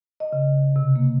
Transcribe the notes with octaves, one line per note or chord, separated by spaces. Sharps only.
D#5
C#3
C3
A#3